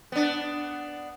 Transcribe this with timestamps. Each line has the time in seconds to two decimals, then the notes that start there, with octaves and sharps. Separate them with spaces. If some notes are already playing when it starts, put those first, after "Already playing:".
0.12 B3 D4